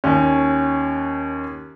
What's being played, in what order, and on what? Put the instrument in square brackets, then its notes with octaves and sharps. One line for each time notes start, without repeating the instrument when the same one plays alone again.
[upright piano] D#2 C#4